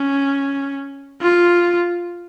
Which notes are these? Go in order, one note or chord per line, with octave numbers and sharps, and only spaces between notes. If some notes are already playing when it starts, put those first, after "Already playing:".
Already playing: C#4
F4